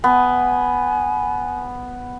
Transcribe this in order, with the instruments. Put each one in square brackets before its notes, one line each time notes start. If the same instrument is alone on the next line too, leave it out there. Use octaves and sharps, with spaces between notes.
[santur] B3 [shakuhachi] G#5